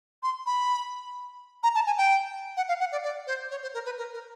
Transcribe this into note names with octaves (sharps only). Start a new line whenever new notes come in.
C6
B5
A#5
A5
G#5
G5
F#5
F5
F#5
D5
D5
C5
C#5
C5
A#4
B4
A#4
A#4